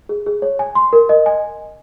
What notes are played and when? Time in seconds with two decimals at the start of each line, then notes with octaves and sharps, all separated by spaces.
0.09 G#4
0.26 G#4
0.42 C#5
0.59 G#5
0.75 C6
0.93 A#4
1.09 D#5
1.26 G#5